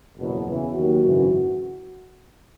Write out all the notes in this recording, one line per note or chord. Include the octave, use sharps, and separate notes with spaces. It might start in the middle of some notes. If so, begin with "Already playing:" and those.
F#1 E2 B2 F#3
E2 C#3 E3
D#2 D#3 F#3 F#4
G#1 F#2 C#3 E3